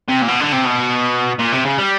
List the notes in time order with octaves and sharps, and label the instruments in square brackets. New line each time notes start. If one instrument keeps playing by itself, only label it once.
[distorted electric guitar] C3
A#2
B2
D3
C3
B2
A#2
C3
C#3
G3